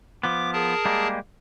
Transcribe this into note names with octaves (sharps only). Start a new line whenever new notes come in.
F3 B3 D6
G#4 A#4 A5
G3 G#3 A#3